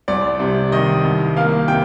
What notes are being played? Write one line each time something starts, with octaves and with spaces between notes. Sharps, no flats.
C2 D5
C3
D#3 D#5
C2
A#3 F5
C3 G5